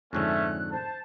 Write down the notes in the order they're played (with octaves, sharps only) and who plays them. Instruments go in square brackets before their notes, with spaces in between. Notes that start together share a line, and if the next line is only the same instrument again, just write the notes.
[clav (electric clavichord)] F2 G#2 D3 [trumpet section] A3 C#4 E5 [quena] F#6
[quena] C5 [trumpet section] A5